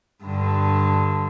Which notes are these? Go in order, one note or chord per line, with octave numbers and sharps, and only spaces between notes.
G2 D3